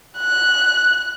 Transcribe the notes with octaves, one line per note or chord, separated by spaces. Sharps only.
F#6